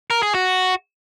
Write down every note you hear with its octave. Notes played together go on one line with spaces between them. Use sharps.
A#4
G#4
F#4